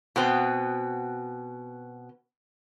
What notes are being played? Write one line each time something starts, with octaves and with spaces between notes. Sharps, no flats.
B2 B3 C4